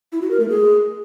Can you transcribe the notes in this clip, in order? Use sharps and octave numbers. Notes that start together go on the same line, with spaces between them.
E4
F#4
A#4
A3
G#4